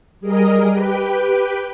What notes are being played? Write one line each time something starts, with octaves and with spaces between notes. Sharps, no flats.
G3 G#4 A#4 D#5
G4 B4 G5